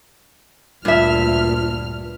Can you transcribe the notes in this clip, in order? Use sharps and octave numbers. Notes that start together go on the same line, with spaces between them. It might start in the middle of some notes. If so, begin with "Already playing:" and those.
D2 G2 A#2 F4 E5 F6